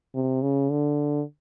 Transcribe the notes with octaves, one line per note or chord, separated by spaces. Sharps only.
C3
C#3
D3